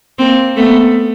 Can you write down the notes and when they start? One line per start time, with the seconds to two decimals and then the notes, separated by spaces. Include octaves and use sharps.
0.19 A#3 C4
0.57 A3 B3